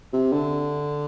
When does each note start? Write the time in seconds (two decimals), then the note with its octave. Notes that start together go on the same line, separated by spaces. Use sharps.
0.13 C3
0.33 D3